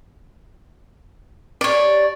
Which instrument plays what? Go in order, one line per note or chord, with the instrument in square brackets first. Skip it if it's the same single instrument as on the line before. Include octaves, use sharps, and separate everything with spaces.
[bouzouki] D4 G4 [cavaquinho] C#5 D5